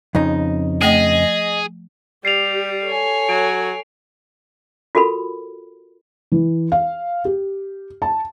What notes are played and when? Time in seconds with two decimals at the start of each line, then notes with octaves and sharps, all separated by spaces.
0.15 F2 C#3 D#4
0.81 F3 A3 G#4 D#5 G5
2.25 G3 G4 C7 F7
2.85 A4 C#5 G#5
3.29 F#3 D7
4.95 F4 F#4 A4 A#4 B5
6.32 E3
6.72 F5
7.25 G4
8.02 A5